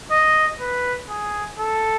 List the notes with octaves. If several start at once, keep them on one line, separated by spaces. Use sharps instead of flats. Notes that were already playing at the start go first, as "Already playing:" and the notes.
D#5
B4
G#4
A4